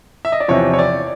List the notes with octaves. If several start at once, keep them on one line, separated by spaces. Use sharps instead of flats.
E5
D#5
D5
E2 C3 F3 C#5
C#5
D5